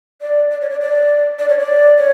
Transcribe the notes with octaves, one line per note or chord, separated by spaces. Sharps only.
D5
D5
C#5
D5
D5
D5
C#5
D5
C#5